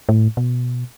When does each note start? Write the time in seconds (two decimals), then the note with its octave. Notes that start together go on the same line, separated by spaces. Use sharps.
0.09 A2
0.37 B2